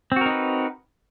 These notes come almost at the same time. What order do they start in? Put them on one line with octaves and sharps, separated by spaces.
C4 F#4 A#4 D#4 B4